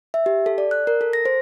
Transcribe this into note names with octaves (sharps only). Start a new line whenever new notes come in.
E5
G4
A4
D5
F#6
A#4
A4
A#6
C5